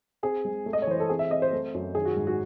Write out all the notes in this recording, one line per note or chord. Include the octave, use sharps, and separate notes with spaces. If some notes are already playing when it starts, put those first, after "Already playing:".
C4 G#4
G#3
A3
D#5
C#5
E3 C5
A4
C4 G#4
E5
C4 D#5
C5
A3
F#2
D#3 G#4
F#4
G#2
F#4